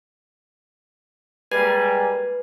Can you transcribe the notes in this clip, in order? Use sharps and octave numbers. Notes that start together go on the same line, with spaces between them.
G3 G#3 A#3 B4 G#5